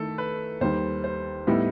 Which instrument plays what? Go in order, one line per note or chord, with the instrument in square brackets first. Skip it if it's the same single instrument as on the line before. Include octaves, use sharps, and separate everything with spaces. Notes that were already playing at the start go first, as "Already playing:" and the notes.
Already playing: [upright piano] D#3 A3 E4 [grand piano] A4
[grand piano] B4
[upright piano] D#2 D#3 G3 [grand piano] C5
[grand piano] C5
[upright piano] A2 G3 B3 E4 [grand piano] D#4